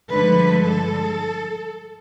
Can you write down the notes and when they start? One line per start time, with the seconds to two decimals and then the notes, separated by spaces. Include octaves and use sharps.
0.11 G2 D3 F3 G#3 B4
0.65 A4